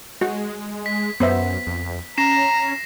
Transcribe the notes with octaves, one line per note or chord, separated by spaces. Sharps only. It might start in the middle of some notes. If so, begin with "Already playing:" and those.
G#3 F#4
B6
F#2 B3 C5 E5
F2
C#4 A#5 A#6 C7 E7